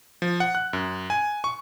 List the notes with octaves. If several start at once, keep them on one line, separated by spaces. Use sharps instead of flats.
F3
F#5
F#6
F#2
G#5
C#6